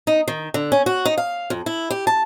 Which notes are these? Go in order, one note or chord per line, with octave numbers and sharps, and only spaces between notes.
D#4
D#3
D3
C#4
F#4
D#4
F5
F2
E4
G4
A5